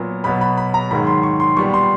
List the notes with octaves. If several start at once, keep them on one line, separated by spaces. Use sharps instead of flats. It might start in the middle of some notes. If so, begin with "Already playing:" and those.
Already playing: A#2 F#3 B3
B2 F#3 B3 B5
B5
B5
A#5
G#2 D#3 F#3 B5
C6
C#6
C6
A#2 G3 B3 C#6
C6